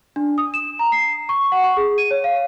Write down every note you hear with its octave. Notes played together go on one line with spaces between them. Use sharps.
D4
D#6
E7
A#5
C7
C#6
F#5
C#6
G#4
D#7
C#5
F5